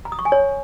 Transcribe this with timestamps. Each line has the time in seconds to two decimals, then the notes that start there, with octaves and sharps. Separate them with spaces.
0.05 A#5
0.12 D#6
0.19 C#6
0.25 G#5
0.32 C#5